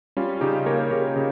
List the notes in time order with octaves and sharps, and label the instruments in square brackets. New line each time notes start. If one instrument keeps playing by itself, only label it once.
[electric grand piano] G3 C#4 F4
C#3 D#4 G4
A#3 A#4 C#5
C#3 G4 A#4
C#3